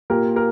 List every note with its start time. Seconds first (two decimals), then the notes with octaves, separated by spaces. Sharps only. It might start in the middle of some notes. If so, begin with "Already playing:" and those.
0.10 A#2 G4 A#4
0.36 G4 A#4